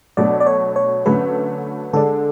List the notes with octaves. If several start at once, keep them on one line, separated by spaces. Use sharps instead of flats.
B2 F#3 A3 D4 D5
D5
C#5
C#5
D3 F#3 A3 C#4 B4
D3 G#3 D4 A4